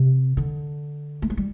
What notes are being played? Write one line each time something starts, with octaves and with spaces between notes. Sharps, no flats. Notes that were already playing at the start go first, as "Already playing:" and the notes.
Already playing: C3
D3
A3
G#3
G3